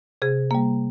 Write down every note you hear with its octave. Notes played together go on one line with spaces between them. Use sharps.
C3 G#4
G3 A#3